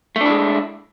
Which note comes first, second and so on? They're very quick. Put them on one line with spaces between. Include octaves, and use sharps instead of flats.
A3 D4 E4 G#3